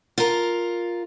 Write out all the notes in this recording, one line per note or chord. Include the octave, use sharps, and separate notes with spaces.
F4 A#4